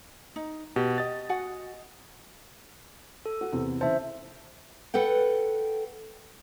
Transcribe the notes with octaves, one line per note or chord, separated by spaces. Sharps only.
D#4
B2 G4
D#5 A6
F#4 F#5 G#5
A4
F#4
E2 C3
C#3 E3 C5 E5 A5
A4 B4 F#5 G5